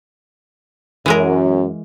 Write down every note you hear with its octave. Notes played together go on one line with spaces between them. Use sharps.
F#2 E3 G#3 A#4